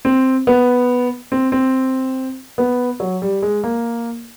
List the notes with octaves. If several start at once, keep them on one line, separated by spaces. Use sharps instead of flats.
C4
B3
C4
C4
B3
F#3
G3
G#3
A#3